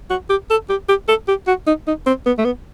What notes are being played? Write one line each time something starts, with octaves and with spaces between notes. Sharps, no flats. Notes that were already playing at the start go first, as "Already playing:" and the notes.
F#4
G4
A4
G4
G4
A4
G4
F#4
D#4
D#4
C4
B3
A3
B3